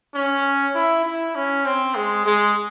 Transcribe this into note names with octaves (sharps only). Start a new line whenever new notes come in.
C#4
E4
E4
C#4
C4
G#3
G#3